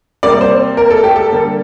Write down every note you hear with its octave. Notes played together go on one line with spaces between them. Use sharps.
C3 G3 A#3 D5
C5
A#4
A4
G4
A4
D3 G3 A#3